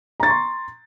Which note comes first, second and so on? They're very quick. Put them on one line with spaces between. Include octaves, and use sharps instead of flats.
A#5 A6 C#6 C6